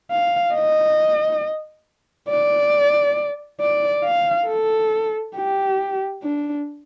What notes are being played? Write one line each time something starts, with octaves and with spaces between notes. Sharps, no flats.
F5
D#5
D5
D5
F5
A4
G4
D4